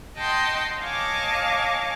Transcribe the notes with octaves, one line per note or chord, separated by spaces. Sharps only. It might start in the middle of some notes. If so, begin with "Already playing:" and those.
D#5 F#5 G5 A5 C6
C#5 D#5 F5 G#5 A5 D6